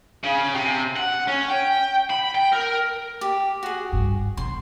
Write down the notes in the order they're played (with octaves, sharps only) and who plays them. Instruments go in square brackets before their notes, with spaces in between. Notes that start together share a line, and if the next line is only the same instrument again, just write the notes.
[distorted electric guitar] C#3
C3
F#5
C#4
G5
B5
G5
A#4
[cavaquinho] G4
F#4 G#4
[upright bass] G2
[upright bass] B2 [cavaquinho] C6